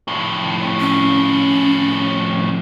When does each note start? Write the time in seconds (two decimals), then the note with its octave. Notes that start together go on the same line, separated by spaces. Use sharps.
0.08 F2 A2
0.80 C#4